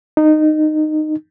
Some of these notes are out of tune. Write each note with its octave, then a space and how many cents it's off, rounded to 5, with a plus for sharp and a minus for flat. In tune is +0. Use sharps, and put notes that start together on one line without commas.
D#4 -15